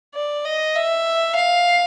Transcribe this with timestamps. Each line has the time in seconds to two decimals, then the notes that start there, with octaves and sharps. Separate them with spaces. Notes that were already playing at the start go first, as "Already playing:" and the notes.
0.15 D5
0.45 D#5
0.76 E5
1.36 F5